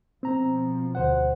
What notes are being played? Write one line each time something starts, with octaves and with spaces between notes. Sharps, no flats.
B2 F3 C4 A#5
D2 C5 F#5